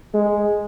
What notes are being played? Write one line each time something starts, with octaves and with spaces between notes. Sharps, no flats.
G#3